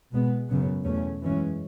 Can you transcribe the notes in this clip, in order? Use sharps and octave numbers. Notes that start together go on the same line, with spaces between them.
B2 G#3 B3
F#2 C#3 F#3 B3
E2 B2 A3 C#4
F#2 E3 G#3 C#4